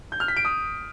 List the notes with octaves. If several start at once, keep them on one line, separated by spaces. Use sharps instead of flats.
G6
F6
B6
D7
D#6